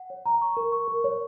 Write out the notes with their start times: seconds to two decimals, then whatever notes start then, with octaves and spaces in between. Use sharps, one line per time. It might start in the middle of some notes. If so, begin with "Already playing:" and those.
Already playing: F#5
0.10 C#5
0.26 A#5
0.41 C#6
0.57 A#4
0.72 C#6
0.88 A#4
1.04 C#5